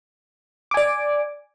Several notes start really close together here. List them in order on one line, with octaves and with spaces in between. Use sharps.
D6 G#5 D5